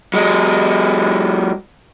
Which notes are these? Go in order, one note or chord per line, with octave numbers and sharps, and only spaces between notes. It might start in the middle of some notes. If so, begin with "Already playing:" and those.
F#3 G#3